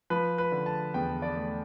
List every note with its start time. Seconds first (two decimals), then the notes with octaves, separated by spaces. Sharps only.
0.10 F3 B4
0.38 B4
0.52 D3
0.66 A5
0.94 E2 G5
1.22 D5
1.36 A3